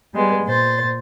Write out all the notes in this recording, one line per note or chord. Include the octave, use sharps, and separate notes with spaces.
G3 G#3 B3
A#2 C5 A6